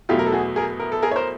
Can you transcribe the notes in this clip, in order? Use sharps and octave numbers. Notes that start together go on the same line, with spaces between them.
E2 B2 F#3 A3 F4 G4
A#4
A4
F#4 G#4
G#4 A#4
A#4
A4
G#4 A#4
C#5
A#4 C5